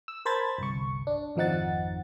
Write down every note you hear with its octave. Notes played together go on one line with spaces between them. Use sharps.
E6
A#4 C5 A5 B5 G#6 A6
G1 C2 C#6
D4
G#1 F2 F3 D#4 F#5 A6